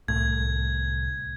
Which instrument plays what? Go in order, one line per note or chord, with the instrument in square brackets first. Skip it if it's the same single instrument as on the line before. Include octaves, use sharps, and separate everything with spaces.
[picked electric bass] C2 A2 [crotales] G#6